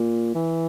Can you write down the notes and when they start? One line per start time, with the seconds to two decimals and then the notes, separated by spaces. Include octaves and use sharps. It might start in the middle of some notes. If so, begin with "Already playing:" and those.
Already playing: A#2
0.35 E3